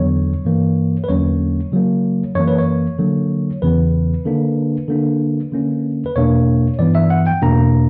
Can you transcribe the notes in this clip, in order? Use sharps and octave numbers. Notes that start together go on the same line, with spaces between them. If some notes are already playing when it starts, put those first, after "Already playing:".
Already playing: E2 D3 F#3 B3 C#5
G2 E3 A#3
B4
E2 D3 F#3 A#3 C#4 C#5
C#3 F#3 A#3
F#2 E3 A#3 C#5
B4
C#5
D3 F#3 A#3
E2 C#3 E3 B3 B4
D3 A#3 D4
D3 A#3 D4
D3 A#3 C#4
B4
E2 B2 A#3 D4 C#5
G2 E3 B3 D5
E5
F#5
G5
E2 B2 A#3 D4 A#5